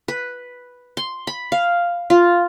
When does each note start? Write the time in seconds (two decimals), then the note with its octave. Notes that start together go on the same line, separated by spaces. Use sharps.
0.08 B4
0.97 C6
1.27 B5
1.52 F5
2.10 F4